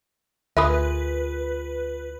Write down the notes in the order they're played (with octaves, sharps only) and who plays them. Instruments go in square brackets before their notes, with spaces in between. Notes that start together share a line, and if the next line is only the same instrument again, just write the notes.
[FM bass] D2 [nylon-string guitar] F4 G#4 A#4 [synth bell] B4 [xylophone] E5 B5 D#6